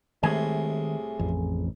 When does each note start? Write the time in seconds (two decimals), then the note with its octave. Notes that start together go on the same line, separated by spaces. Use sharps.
0.23 C2 A2 D#3 G#3 C4 G#4 G#5
1.19 A1 F2